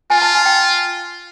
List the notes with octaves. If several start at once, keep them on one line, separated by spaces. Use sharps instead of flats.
F4 G#5
A5
G#5
G5